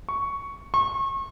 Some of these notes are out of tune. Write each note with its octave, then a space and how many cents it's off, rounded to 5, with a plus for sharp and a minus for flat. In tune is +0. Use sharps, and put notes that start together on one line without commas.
C#6 +5
C#6 -35